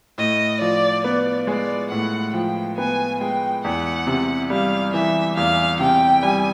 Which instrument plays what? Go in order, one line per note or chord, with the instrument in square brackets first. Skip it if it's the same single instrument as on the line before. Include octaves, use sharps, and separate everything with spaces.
[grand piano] A2 [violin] D#5
[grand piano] F3 [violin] D5
[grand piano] B3 [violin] D5
[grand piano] G#3 [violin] D5
[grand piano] A2 [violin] F#5
[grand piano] F3 [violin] G5
[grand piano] B3 [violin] G#5
[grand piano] G#3 [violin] G5
[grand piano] E2 [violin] F#5
[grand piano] C3
[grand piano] G3 [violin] F5
[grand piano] E3 [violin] E5
[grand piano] E2 [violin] F5
[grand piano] C3 [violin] G5
[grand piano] G3 [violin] G#5